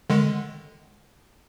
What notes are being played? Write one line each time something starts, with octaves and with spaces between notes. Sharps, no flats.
D3 D#3 G#3